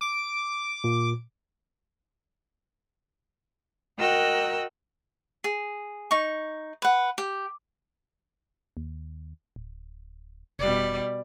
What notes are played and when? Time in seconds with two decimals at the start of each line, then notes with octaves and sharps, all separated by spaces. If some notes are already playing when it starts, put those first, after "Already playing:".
0.01 D6
0.84 A#2
3.98 F#4 A#4 D#5 G5 E6 F#6
5.44 G#4
6.11 D#4 C#6
6.82 B4 F#5
7.18 G4
8.77 D#2
9.56 D1
10.59 F1 B2 G3 D5